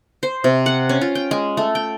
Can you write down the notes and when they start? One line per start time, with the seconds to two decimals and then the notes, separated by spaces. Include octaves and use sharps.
0.23 C5
0.44 C3
0.66 F#5
0.89 C#4
1.01 F4
1.15 G5
1.31 G#3
1.57 A3
1.75 G5